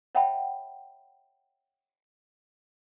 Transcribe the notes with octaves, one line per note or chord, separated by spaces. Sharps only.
C#5 E5 F#5 G5 A5 B5